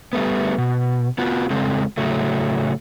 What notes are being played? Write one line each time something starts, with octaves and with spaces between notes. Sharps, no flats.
G3 A3 B3
B2
B3 F4 F#4
C#3 G#3 C4 A4
A2 C#3 F#3 A3